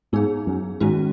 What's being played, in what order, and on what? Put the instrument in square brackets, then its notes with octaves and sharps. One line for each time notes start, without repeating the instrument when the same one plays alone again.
[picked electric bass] G#2 [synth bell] B3 D#4 G#4
[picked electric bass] F#2
[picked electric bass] G#2 [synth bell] D#3 G#3 C#4 F#4